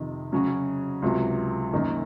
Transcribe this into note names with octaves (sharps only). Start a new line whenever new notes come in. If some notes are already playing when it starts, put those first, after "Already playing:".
Already playing: F2 C3 D#3
C#3 F#3 C#4 F#4
C#2 C3 F#3
F#2 D#3 A#3 C#4